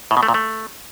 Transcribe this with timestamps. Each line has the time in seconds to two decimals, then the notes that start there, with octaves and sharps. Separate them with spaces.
0.11 A2
0.17 B2
0.23 A3
0.28 A#2
0.34 A3